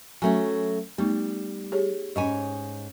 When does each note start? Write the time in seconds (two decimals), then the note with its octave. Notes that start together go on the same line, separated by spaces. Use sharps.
0.22 F#3 A3 C#4 G#5
0.98 G3 A3 B3 D#4
1.72 G4 G#4 C#5
2.16 G#2 C#4 C#5 D#5 G#5